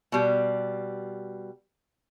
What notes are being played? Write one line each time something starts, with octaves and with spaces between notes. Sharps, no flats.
B2 G3